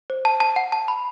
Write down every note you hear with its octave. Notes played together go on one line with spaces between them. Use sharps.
C5
A5
A5
F#5
A5
B5